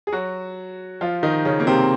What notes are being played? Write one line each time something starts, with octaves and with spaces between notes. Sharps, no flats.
G#4
F#3 F#4
F3 F4
D#3 D#4
C#3 C#4
A#3
C3 C4